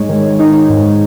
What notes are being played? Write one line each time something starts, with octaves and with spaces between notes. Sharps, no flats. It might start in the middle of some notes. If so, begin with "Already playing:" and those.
Already playing: G#2 G#3 D#4 C#5
D#3
D#4
G#2